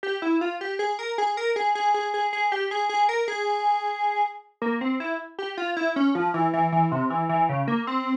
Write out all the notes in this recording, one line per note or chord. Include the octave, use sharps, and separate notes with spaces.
G4
E4
F4
G4
G#4
A#4
G#4
A#4
G#4
G#4
G#4
G#4
G#4
G4
G#4
G#4
A#4
G#4
A#3
C4
E4
G4
F4
E4
C#4
F3
E3
E3
E3
C3
E3
E3
C#3
A#3
C4